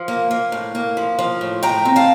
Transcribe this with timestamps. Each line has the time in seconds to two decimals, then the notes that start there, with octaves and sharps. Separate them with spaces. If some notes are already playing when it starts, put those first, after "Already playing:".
Already playing: F3 F5
0.08 A#3
0.31 A#3
0.52 A2
0.75 A#3
0.97 F3
1.19 F3
1.41 A2
1.63 A2 G5 A#5
1.85 C4
1.96 F5 A5